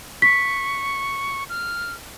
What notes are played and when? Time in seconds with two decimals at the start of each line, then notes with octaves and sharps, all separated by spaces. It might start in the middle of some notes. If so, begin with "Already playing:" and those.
0.22 C#6 B6
1.49 F6